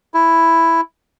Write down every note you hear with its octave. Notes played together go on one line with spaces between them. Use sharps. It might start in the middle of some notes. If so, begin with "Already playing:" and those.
E4